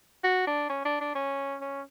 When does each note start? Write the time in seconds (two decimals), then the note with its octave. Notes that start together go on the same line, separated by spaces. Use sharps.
0.24 F#4
0.47 D4
0.69 C#4
0.85 D4
1.01 D4
1.15 C#4
1.61 C#4